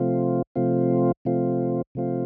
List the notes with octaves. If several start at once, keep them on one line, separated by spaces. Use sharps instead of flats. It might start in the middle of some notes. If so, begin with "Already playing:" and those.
Already playing: C3 F3 A3 C4 F4
C3 F3 A3 C4 F4
C3 F3 A3 C4 F4
C3 F3 A3 C4 F4